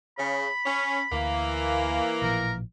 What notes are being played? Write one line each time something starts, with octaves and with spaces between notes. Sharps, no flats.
C#3 B5
C#4
D2 E3 A#3
A1 A#2 F3 A#4